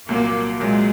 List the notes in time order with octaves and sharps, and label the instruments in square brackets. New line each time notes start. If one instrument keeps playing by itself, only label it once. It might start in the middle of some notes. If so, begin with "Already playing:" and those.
[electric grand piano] C2 A#2 F#3 [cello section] A#3
[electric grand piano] C2 A#2 F#3 [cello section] G#3